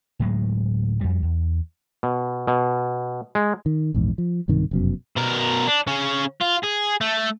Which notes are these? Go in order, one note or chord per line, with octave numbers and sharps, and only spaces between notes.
D1 A2 F#3 G#3
F2 G3
E2
B2
B2
G#3
D#3
A#1 E2 G#2
F3
B1 G2 C3 D#3
F1 F#2 B2
B2 A#4
D4
C#3 C#4
F4
G#4
A3